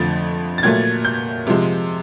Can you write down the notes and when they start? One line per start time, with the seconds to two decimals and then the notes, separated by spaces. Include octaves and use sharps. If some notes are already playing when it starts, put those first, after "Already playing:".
Already playing: F2 D3 F3 A3 A6
0.58 A6
0.63 A#2 F#3 A3 G#6
1.05 G6
1.47 C3 F3 G#3